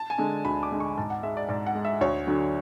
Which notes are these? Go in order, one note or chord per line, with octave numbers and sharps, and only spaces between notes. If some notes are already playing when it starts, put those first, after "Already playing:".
Already playing: A5
G#5
D3 G#3
D2 B5
D6
D3 G#3
C#6
G#2 A5
F#5
G#3 E5
D5
G#2 D5
F#5
G#3
E5
D2 C#5
D3 F#3